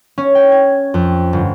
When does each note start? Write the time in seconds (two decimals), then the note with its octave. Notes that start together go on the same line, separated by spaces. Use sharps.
0.18 C#4
0.35 G5
0.51 G#6
0.94 F2
1.33 G1